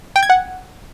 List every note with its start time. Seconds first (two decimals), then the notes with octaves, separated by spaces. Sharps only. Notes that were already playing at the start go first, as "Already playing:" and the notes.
0.16 G5
0.23 G#6
0.30 F#5